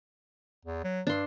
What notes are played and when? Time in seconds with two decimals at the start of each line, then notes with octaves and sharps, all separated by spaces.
0.65 E2
0.84 F#3
1.07 G2 D4 C6